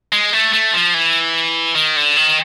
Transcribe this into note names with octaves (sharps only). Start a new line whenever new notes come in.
G#3
A3
A3
F3
E3
D#3
D3
D#3